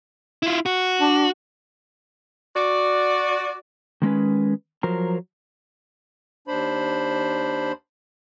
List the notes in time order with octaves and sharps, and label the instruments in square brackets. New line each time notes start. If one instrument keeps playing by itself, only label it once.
[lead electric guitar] E4 F4
F#4
[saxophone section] D4
F#4 D5
[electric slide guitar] D#3 G#3 C#4 B4
F3 F#3 A#4 C5 A#5
[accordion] D#2 D4 C5 B5